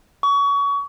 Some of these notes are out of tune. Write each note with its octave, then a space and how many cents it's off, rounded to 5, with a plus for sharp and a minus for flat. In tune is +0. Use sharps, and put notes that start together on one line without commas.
C#6 +30